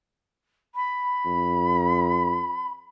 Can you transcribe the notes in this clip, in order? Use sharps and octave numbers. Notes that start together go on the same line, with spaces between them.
B5
F2